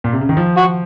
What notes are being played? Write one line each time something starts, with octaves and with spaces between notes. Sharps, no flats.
A#2
C3
C#3
D#3
F3
F#4